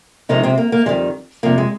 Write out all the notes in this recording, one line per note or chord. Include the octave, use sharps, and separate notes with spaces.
C3 D#3 F3 G#3 D#4
C3 C4
A#3
A#3
F2 D#3 G3 G#3
F2 C3 G3 A#3
G#3